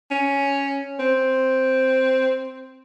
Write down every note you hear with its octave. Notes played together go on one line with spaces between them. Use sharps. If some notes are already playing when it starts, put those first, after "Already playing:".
C#4
C4